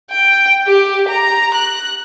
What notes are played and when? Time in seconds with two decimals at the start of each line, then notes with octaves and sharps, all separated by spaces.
0.11 G5
0.67 G4
1.09 A#5
1.54 F#6